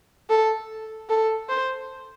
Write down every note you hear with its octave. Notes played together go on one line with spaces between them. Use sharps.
A4
A4
C5